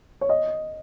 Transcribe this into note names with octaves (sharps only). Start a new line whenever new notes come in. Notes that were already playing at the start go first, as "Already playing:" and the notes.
C#5
D#5